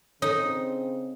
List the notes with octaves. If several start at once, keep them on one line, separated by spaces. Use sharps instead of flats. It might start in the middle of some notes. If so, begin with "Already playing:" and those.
C#3 C4 D#4 A4 C#5